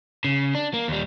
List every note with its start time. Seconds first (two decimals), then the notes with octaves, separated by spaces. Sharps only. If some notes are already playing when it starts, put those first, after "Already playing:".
0.24 C#3
0.55 D4
0.74 A#3
0.88 D#2 G3